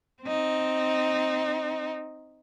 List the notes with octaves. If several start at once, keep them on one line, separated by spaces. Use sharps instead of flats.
C4 D#4